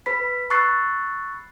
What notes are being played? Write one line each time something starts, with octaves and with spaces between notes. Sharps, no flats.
B4 B5 B6
B5 C#6 E6 F#6 A6 C7